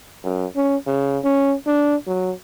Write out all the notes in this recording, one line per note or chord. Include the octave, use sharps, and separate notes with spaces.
F#2
C#4
C#3
C#4
D4
F#3